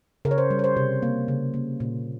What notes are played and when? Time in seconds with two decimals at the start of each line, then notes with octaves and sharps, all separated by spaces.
0.25 C#3 A#4
0.31 C#5
0.38 C5
0.50 G3
0.59 C#5
0.64 C5
0.77 C3
1.02 A#3
1.28 C#3
1.54 A#3
1.80 A#2